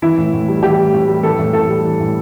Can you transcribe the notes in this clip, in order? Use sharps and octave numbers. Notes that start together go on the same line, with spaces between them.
E3 E4
A2
A2
G3
E3 G4
A2
A2
G3
E3 A4
A2
A2 A4
G3
E3
A2